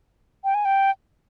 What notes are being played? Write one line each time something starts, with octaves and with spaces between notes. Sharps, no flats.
G5
G#5
G5